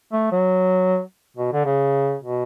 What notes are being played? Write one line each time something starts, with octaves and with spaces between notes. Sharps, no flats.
A3
F#3
B2
D3
C#3
B2